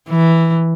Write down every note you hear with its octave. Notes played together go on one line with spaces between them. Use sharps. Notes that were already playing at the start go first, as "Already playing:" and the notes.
E3